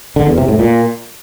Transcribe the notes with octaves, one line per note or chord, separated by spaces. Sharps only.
D3
E2
C3
A2
A#2